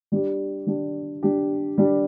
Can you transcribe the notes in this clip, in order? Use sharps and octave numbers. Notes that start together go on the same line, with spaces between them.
G3 D4 G4
G3 D4 G4
G3 D4 G4
G3 D4 G4